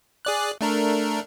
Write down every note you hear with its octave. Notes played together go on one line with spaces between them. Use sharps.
G#4 D5 F#6
A3 D4 A#4